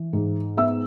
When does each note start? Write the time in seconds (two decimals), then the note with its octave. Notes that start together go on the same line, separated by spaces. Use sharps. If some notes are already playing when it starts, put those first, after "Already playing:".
Already playing: E3
0.13 G#2
0.57 B3 E5 E6